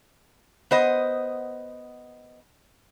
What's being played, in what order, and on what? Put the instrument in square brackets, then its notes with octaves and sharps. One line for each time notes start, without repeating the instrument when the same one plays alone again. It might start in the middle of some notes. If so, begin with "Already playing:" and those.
[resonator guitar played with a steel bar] B3 C5 D#5